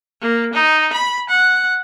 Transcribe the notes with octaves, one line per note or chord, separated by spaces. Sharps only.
A#3
D#4
B5
F#5